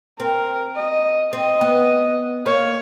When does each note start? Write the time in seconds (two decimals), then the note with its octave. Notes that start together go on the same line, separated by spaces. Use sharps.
0.19 C4 A#4
0.76 D#5
1.32 C4 D#5
1.61 B3
2.46 A#3 C#5